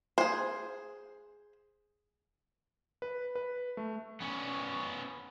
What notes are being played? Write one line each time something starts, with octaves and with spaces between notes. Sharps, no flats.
G#4 C5
B4
B4
A3
B3 C#4